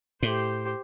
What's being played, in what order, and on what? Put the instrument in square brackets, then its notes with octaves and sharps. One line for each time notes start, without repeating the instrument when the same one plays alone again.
[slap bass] A2 [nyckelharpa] G4 C5